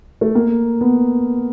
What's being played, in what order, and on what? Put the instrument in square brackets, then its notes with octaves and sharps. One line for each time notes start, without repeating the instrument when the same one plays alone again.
[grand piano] A3
A#3
B3